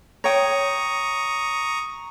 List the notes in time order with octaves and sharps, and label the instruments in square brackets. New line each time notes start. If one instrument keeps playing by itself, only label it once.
[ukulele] C#5 G5 [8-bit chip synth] A#5 C#6 D#6